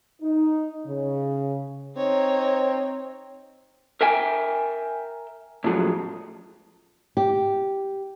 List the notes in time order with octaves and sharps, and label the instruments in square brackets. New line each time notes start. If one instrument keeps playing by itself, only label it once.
[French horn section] D#4
C#3
[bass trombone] C4 [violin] D#4 C#5
[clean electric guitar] A#4 E5 G5 G#5
A2 C#3 F3 F#3 G#3
[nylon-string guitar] G4